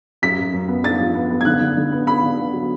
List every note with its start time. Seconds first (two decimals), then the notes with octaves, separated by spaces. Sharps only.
0.22 F#2 B6
0.38 F#2
0.53 F#2
0.68 B3
0.84 D4 A6
0.99 F3
1.15 B3
1.30 B3
1.41 G#6
1.45 D3 F#6
1.61 D3
1.77 D3
1.92 B3
2.07 B3 B5
2.23 D3
2.38 B3
2.53 F#3